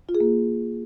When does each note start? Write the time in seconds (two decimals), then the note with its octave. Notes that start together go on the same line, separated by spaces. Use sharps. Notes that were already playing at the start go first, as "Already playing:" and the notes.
0.09 F4
0.15 G#4
0.20 A#3